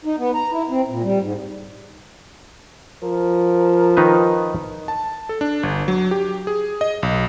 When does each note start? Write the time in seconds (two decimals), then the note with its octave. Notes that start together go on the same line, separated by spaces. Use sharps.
0.05 D#4
0.19 B3
0.34 A#5
0.51 E4
0.69 C4
0.89 A#2
1.03 G3
1.20 G#2
3.03 F3 A#4
3.97 D#3 D#4 B4
4.88 A5
5.29 A4
5.41 D4
5.63 G1
5.88 F#3
6.11 G4
6.47 G#4
6.81 D#5
7.03 B1